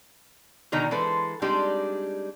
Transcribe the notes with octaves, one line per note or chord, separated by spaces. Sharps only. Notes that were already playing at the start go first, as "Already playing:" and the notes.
B2 D3 D#3 D#4 A#5
E3 G#3 A4 B4 C5
G3 G#3 C4 D4 D#4 G4